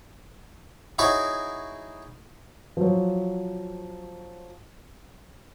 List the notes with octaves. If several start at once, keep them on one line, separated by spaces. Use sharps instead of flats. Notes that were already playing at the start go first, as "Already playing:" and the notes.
D#4 E4 F#4 G#4 C#5
F3 F#3